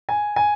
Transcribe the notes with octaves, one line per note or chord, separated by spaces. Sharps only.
G#5
G#5